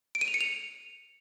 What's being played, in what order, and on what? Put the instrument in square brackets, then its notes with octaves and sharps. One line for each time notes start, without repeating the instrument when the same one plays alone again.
[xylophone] D7
D#7
F7
C#7
F7